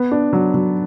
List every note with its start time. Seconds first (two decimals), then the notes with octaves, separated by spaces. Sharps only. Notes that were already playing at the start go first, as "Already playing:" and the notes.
Already playing: B3
0.12 D4
0.33 F#3
0.54 F#3